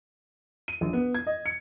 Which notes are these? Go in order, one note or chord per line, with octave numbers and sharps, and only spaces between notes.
D#7
A#1
B3
G#6
D#5
C#7